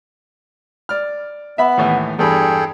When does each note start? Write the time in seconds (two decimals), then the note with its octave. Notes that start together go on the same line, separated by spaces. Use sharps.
0.89 D5 F6
1.58 B3 E5 B5
1.77 D#2 A2 E3
2.19 E2 G2 G#4 A4 G5